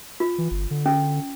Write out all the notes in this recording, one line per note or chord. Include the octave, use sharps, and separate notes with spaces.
F4
E3
G1
D3
C#4